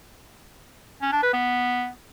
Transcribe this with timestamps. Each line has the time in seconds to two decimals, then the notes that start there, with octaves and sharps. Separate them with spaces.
1.02 C#4
1.12 D4
1.23 B4
1.33 B3